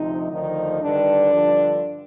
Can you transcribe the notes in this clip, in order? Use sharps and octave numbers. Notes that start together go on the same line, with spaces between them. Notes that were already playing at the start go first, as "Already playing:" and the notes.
Already playing: D2 C3 F3 D#4
D2 D3 D#3 F3 D#4
G2 D3 D#3 D4
G2 D3 F3